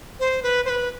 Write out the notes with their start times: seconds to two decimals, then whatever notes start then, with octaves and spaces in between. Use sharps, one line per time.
0.20 C5
0.43 B4
0.65 C5
0.69 B4